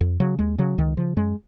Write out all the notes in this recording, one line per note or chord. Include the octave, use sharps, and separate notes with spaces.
F2
C#3 F#3
D#2 G#3
C#3 F#3
C#2 D#3
C#3 F3
F#2 G#3